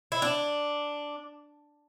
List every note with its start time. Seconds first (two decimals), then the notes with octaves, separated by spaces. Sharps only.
0.12 E4
0.22 D4